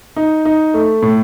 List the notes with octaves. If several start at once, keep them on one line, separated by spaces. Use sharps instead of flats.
D#4
D#4
A3
A2